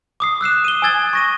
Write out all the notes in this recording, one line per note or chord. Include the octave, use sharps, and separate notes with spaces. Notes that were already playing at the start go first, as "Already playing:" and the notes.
D6 D#6 C7
E6 F#6 C7 E7
D#7 G7
G#5 D#6 E6 G#6 A6 G7
C#6 A#6 D#7